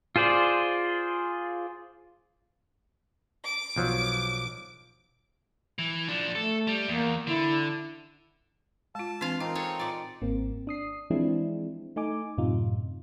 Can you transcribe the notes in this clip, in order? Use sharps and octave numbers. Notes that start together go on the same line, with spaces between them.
F4 G#4 C5 D5
D6
B1 F3 F#3
E3
F3 D4
A3 A4
G3
E2 A#3
D3 E4
G#3 F4 A5
E3 C4 D4 F4 F5
C4 D#4 F4 A#4 F5
G#4 A4 C#5
A#2 F4 D5
G#1 A#3 C4
D4 D#6 C7
E3 F3 G#3 C4 D4 E4
A3 D#4 G#5 D6
F#2 A2 C3 D#4 F4